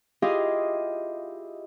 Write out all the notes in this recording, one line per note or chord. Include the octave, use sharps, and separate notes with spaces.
E4 F4 G4 G#4 D#5 F5